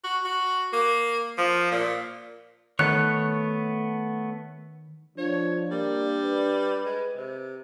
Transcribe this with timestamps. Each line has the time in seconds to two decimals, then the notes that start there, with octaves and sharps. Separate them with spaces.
0.04 F#4
0.24 F#4
0.73 A#3
1.38 F3
1.72 A#2
2.79 D#3 A3 B3 C#5 F#6
5.18 F3 D4 C#5
5.71 G3 A#3
6.24 B4
6.85 G#3
7.17 C3